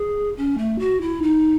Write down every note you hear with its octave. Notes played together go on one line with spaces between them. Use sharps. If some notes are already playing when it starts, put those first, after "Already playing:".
Already playing: G#4
C#4
A3
F#4
E4
D#4